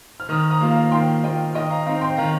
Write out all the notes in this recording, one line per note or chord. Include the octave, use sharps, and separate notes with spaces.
F6
D#3 A#5 D#6
A#5 D#6
A#3 F4
F5 A#5
D#3 G5 C6
A#3 F4 D#5 G5
D#3 D#5 G5
F5 A#5
C4 D#4 F5 A#5
G5 C6
D#3 F5 A#5